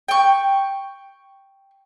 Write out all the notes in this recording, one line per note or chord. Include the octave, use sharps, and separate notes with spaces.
G5 C#6